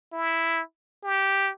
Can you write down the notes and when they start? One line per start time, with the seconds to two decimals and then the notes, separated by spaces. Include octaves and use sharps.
0.13 E4
1.03 G4